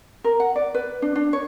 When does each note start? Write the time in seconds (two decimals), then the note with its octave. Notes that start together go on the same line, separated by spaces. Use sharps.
0.24 A#4
0.40 F#5
0.56 D5
0.74 B4
1.02 D4
1.16 D4
1.33 C#5